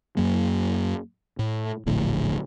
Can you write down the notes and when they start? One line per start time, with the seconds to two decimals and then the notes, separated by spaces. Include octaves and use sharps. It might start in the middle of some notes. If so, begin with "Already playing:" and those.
0.17 F#2 F#3 A#3
1.39 A2
1.86 D1 A#1 A2 D3